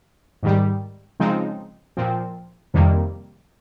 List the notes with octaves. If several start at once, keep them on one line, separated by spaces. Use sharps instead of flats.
G#2 D#3 G3
C#3 F3 G#3 C4 D#4
A#2 F3 C4
F2 C3 D#3 G3 A#3